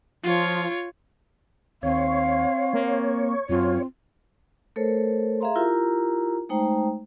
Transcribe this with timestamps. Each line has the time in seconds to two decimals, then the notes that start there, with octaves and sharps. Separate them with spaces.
0.24 F3 F4 C#5
1.83 D#2 C4 C#5 F5
2.73 A#3
3.49 F#2 C4 F4
4.76 A3 A4 A#4 C5 C#5
5.40 G#4 E5 F5 A#5 C6
5.56 E4 F4 G4 A#4 A#5
6.49 G#3 A3 D#4 C5 G5 A#5